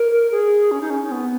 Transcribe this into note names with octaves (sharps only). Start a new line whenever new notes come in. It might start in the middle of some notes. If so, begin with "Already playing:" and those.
Already playing: A#4
G#4
C#4
D#4
C#4
C#4
B3